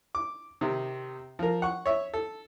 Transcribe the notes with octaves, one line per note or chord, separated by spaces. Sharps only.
D6
C3 D#3
F3 A#4
F#5 C#6
C#5 E5
A4